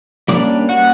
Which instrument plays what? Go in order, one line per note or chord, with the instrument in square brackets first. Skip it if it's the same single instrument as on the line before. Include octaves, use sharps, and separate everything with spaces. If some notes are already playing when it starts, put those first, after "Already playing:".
[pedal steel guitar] G3 A#3 C#4 D4 D5
F#4 F#5